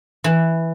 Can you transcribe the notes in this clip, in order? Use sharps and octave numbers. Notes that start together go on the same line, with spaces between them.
E3